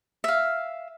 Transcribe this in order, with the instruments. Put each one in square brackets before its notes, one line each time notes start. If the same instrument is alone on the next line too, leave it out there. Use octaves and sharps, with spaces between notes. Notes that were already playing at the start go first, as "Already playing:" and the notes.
[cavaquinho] E5 F5